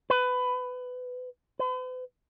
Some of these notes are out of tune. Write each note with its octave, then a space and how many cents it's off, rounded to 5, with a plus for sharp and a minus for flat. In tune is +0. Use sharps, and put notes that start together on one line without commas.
B4 +20
B4 +45